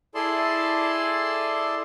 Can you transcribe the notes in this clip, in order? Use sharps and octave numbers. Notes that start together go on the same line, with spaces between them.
E4 G#4 A4 D5 A5 C6